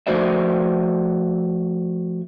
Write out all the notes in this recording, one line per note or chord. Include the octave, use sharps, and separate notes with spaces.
F3 A3 F#4 C5 D5 E5